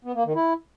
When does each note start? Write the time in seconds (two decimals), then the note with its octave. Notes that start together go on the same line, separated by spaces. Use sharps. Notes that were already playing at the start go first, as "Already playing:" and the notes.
0.05 B3
0.15 A#3
0.25 D#3
0.35 E4